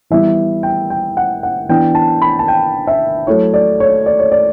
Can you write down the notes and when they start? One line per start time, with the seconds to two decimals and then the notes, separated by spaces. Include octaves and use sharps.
0.10 E3 G3 B3 E4 E5
0.63 G5
0.90 G5
1.17 F#5
1.43 F#5
1.69 E3 B3 D4 G5
1.95 A5
2.22 B5
2.39 A5
2.48 G5
2.87 E5
3.27 F#3 A3 E4 C#5
3.54 D5
3.80 C#5
4.06 D5
4.19 C#5
4.32 D5